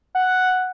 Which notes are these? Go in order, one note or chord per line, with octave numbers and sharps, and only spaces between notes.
F#5